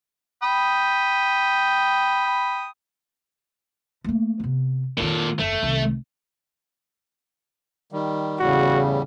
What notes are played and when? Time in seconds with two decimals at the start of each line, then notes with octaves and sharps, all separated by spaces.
0.43 G5 B5 D#6
4.04 A3 A#3
4.40 C3 B3
4.98 F2 A#2 D#3 A4
5.39 F#1 E2 A3
5.63 C2 D#3
7.92 D#3 G3
8.40 E2 A2 C#3 G3 F#4